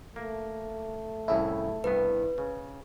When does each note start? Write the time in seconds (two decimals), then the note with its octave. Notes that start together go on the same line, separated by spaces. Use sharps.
0.16 A3 A#3
1.28 C2 A2 C#3 E4
1.84 C2 G2 B3 B4
2.38 C#3